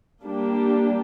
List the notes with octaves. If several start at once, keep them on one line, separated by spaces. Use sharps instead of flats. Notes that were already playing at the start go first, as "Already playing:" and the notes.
G3 A#3 D4 G4